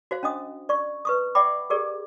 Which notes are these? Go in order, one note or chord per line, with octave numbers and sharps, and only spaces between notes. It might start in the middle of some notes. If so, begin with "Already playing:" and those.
F#4 C5 F5
C#4 D4 D#5 D#6
D5 C#6
B4 C#6 D#6
D5 E5 F#5 G5 B5 D6
G4 G#4 A#4 D5